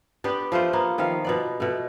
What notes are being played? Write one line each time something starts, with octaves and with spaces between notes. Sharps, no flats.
B3 D4 G4 B4
F3 A3 F4 C5
A#3 B3
D#3 F3 E5 F5
B2 B3 D5
B2 A3